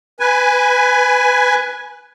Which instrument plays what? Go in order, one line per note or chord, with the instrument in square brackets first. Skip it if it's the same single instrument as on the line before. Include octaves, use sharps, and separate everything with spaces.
[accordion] B4 G#5